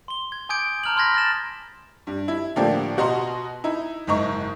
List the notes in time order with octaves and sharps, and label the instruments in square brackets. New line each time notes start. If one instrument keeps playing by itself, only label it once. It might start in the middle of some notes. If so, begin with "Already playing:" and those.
[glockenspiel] C6 G7
G#6
G#5 D6 D#6 G6 G#6 D7
A5 A#5 F6 G6 F#7
B5 C6 F6 G#6 A#6 B6
F6 A6 E7
[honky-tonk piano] G2
E4
A2 D3 F3 A#3 D4 G4
B2 F#4 D#5 A#5 C6
D#4 E4
F#1 G#2 D#5 A#5 C#6